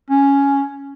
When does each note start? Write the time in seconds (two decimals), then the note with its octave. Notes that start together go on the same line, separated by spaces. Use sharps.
0.10 C#4